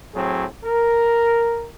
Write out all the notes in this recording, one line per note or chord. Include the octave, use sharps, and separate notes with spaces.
A2 F#3 C4 G#4
A#4